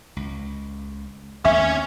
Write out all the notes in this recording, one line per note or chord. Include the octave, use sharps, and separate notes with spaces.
C#2
D#2 A3 C#4 E5 G#5